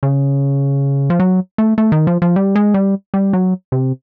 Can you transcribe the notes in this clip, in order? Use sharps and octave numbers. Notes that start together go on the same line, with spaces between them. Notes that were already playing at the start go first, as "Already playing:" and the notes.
C#3
F3
F#3
A3
A3
D#3
F3
F3
G3
G#3
G3
G3
F#3
C3